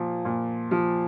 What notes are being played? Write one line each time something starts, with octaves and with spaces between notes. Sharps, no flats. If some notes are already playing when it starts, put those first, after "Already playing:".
Already playing: A#2 F3
A#2
F3